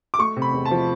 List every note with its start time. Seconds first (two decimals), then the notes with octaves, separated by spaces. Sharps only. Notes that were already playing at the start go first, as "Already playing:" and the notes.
0.14 D6
0.19 A3 C#6
0.36 C3
0.42 B5
0.53 E2
0.65 A5
0.71 F3